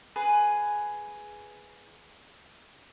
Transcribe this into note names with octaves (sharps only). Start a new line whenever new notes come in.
G#4 B4